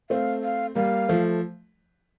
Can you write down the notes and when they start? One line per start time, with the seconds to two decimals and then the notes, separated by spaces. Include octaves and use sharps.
0.10 A3 C4 F5
0.44 F5
0.75 G3 A#3 F5
1.09 F3 A3